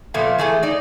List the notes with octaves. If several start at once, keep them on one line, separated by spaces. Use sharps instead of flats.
A#2 F3 A3 B3
E3 A3 G#4 A4
D#4 D5